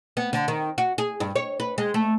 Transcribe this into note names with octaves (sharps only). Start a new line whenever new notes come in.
B3
D3
D#3
F#4
G#4
G2
C#5
B4
G#3
A3